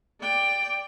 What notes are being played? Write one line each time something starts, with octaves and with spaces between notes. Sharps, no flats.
D5 G5